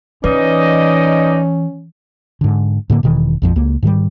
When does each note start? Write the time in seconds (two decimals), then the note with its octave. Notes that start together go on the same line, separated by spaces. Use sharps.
0.24 E3 C#4 D#4 B4 D5 D#5
2.41 G#2 D3
2.90 A2 D3 A#3
3.03 E1 B2 D#3 E3
3.42 A#1 F2 F3
3.56 C#2 A#3
3.83 G#2 D#3 F#3 G3